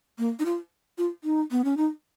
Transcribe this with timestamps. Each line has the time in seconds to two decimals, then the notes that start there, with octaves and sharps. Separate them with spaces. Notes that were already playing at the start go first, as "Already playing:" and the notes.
0.18 A#3
0.39 D#4
0.45 F4
0.98 F4
1.24 D#4
1.51 B3
1.64 C#4
1.77 D#4